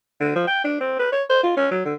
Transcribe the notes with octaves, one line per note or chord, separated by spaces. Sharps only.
D3
F3
G5
D4
C4
B4
C#5
C5
F4
C#4
F#3
D3